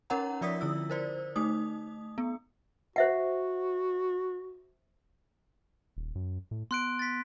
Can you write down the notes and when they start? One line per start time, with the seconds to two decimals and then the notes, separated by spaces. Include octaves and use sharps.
0.10 C#4 D#4 A#4 C#5 F#5 A#5
0.41 F3 F4 D5 E5 D#6 B6
0.61 D3 E4 E6
0.90 A#4 C5 D5
1.36 A3 D#4 D#6
2.18 B3
2.96 F#4 C5 E5 F#5
5.97 D#1
6.15 F#2
6.51 A2
6.71 B3 C6 F#6 D7
6.99 A6 B6